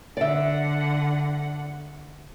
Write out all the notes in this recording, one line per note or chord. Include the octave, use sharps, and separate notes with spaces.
D3 D5 E5 F#5